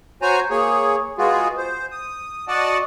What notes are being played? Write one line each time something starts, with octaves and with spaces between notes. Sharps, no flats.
F#4 C5 C#5 G#5 A#5
A#3 G#4 C#5
G#3 B3 F4 F#4 G#4
C5
D#6
F#4 D5 D#5 F#5 A5